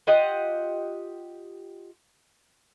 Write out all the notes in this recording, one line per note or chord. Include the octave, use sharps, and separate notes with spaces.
F4 G4 D#5 F#5